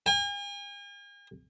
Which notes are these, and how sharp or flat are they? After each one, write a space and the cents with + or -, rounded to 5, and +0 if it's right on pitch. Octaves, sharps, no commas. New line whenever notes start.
G#5 -45